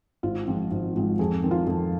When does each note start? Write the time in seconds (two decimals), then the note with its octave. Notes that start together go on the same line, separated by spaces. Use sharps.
0.23 G#1 F4
0.47 G#2 F3 C4
0.71 G#1
0.96 G#2 F3 C4
1.19 F2 G#4
1.43 D#3 C4
1.51 F4
1.67 F2